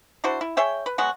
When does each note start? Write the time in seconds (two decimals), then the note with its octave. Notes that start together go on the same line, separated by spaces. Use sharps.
0.24 D4 E4 F#4 C5
0.41 E4
0.57 G#4 C#5 E5 G5
0.86 B4
0.98 F#3 G#3 B3 F#4